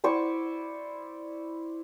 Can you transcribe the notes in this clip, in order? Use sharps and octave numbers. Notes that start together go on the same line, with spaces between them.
E4 C5 D5 C#6